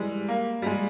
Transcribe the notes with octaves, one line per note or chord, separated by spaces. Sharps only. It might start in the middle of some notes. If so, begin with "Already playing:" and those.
Already playing: E3 G3 G#3
A#3
G3
G#3